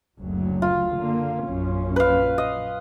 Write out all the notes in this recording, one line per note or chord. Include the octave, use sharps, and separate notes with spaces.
F#1 D2 F#3
F4
D3 A#3
A#1 F#2 C#4
B4 F5
D#5